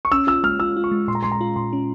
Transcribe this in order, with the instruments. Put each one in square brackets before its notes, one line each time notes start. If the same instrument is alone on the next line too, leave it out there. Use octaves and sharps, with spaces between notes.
[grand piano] C#6
[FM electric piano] C#4 [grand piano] E6
[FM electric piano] F4 [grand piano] E6
[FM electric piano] G#3 [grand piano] F6
[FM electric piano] F4 [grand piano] E6
[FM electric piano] F4
[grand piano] C#6
[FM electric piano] G#3
[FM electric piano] A#2 [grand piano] C6
[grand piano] A#5
[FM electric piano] G#3 [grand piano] C6
[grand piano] A#5
[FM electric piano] F4
[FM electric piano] A#2 [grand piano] C6
[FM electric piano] C#4